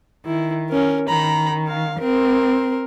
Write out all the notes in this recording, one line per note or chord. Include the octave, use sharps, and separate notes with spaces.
D#3 E4
C#4 A#4
D#3 A#5 B5
F5
C4 A#4